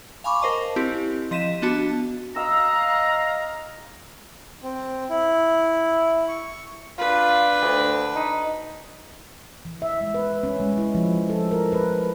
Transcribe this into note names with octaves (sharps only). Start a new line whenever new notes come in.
F5 G#5 B5 C#6 D6
A#4 C5 D#5 A5
C4 E4 G4
F3 D#5 B6 D#7 E7
B3 D4 F#4 A5
D#5 F5 A#5 E6
C4
E4
C#6
D4 F4 B4
D2
D#4
E3
E5
G#3
B4
C#4
G#3
E4
F3
A4
A#4
B4